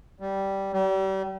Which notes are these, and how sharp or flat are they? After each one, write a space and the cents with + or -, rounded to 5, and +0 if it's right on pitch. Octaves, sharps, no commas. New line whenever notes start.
G3 -10
G3 -35